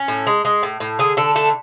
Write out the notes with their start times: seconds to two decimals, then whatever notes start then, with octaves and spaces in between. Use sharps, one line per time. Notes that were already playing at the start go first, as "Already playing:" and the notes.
Already playing: C#4
0.08 A2
0.27 G#3
0.45 G#3
0.63 A2
0.80 A2
0.99 D3 G#4
1.17 D3 A4
1.35 A3 A4